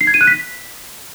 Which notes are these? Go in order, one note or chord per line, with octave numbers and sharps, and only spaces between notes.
C7
G#6
D#7
F#6
B6